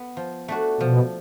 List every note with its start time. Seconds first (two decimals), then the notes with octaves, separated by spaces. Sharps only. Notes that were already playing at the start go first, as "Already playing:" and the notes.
Already playing: B3
0.17 F3
0.48 A3 D4 F#4
0.81 B2 F3